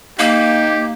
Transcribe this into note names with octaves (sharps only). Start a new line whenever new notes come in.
A#3 D#4 G4 F5